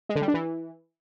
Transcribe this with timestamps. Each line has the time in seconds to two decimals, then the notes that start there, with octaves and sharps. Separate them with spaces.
0.09 G#3
0.16 D3
0.22 G3
0.28 D4
0.34 E3